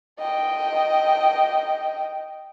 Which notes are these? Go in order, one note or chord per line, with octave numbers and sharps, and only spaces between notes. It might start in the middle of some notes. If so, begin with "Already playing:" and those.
D#5 G5